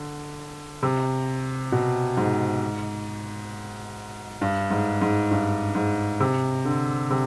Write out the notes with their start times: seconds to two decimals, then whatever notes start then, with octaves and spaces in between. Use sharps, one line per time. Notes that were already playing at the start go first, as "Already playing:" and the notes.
Already playing: D3
0.83 C3
1.72 B2
2.17 G#2
4.41 G2
4.71 G#2
5.02 G#2
5.31 G2
5.75 G#2
6.20 C3
6.65 D3
7.10 C3